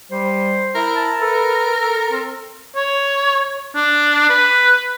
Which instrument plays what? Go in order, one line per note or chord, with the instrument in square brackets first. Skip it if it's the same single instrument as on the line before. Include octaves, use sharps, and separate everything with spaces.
[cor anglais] G3 [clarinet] C5
[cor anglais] E4 [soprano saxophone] A#4
[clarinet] A5
[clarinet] A4 [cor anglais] B4
[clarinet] A4
[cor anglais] C4
[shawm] C#5
D4
B4